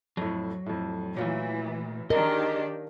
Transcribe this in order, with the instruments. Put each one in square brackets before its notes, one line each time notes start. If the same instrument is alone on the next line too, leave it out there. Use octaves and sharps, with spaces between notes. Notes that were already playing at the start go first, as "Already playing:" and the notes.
[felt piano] F2 A2 [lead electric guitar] F#3
[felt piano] F2 A2
[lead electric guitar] A#2 A3 [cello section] E3 [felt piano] F#3 F4
[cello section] D#3 D4 G4 [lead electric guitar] G#4 D#5 [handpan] A#4